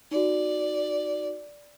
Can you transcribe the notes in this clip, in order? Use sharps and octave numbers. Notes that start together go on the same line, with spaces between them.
D#4 F#4 D5